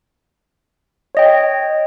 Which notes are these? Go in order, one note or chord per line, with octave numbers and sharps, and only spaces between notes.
C#5 D#5 G5